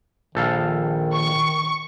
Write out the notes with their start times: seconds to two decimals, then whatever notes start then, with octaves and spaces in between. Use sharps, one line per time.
0.35 A#1 D#3 A4 F5
1.14 C#6